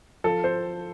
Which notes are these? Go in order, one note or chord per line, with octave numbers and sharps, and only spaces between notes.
F3 A4
C5